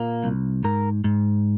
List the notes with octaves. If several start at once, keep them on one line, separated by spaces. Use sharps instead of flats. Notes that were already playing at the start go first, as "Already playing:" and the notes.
Already playing: A#2 A#3
C2
G#2 A#4
G#2